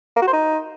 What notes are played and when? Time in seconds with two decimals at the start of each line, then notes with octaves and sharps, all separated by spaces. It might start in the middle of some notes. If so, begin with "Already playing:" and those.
0.16 A#3
0.22 F#4
0.27 C5
0.33 D#4